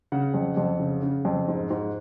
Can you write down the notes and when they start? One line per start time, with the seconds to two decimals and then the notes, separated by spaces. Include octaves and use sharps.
0.12 C#3 F#5
0.34 F2
0.57 F2
0.79 C#3
1.02 C#3
1.25 F2
1.48 G#2
1.70 G#2